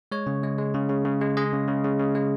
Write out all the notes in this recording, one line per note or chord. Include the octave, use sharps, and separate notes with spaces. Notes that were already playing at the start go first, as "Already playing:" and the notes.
G#3 C#5
C#3
G#3
G#3
C#3
C#3
C#3
G#3
G#3 D#5
C#3
C#3
C#3
C#3
G#3